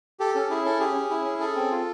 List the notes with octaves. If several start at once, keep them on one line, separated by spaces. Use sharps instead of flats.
G4 A4
C#4 A4
E4 G#4
C#4 A4
G4 G#4
C#4
E4
C#4
G#4 A4
C4
F4